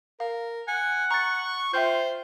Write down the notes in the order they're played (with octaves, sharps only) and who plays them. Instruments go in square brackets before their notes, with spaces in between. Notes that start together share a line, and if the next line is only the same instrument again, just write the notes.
[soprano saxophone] A#4 [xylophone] F5
[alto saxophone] F#5 [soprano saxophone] G#5
[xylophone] A#5 A6 [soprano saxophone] C#6
[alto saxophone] F4 [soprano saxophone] C5 [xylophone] E5 G5 G6